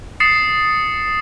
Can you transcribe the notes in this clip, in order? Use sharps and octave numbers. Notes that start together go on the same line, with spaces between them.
D#6 A6 C7 C#7 E7